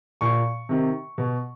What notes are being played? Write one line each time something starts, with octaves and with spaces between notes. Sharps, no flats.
A#2 C#6
C3 D#3
B2